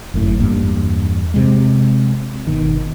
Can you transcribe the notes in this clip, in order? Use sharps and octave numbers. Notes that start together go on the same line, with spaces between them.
G1 F#2 A2
E2 G2 A#3
C3 G#3
G1 B2 D#3